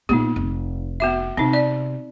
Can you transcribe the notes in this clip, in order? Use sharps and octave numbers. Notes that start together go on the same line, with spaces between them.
A#2 B3 D#4 G4
F1
B3 F#4 E5
C3 C4 D#4
D5